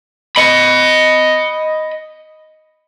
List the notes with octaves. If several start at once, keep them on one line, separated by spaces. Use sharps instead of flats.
D#5 B5